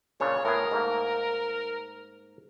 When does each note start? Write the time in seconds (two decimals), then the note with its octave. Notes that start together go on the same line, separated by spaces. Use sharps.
0.20 A#2 C#3 D4 C#5
0.45 A2 B3 G#4 A#4
0.71 G#2 A3 A#3